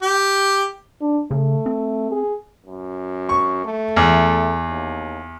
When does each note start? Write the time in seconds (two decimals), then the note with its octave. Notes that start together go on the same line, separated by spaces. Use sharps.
0.02 G4
1.01 D4
1.31 C#3 A3
1.66 C4
2.11 G#4
2.66 F#2
3.29 C#6
3.65 A3
3.96 E2
4.69 D#2